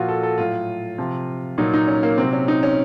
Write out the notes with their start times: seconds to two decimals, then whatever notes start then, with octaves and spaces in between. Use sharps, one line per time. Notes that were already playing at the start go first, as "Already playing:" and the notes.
Already playing: A#2 F3 F4 F#4
0.08 A4
0.23 A4
0.38 A2 F#3 F4
0.98 C3 F3
1.58 A#2 F#3 D#4
1.74 D#4
1.87 C#4
2.03 A#3
2.18 C3 F#3 C4
2.33 C#4
2.48 D#4
2.63 C#4